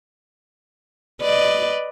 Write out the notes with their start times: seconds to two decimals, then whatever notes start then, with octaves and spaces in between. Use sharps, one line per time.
1.21 B4 D5 D#5